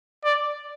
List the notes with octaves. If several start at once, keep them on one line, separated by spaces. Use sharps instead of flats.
D5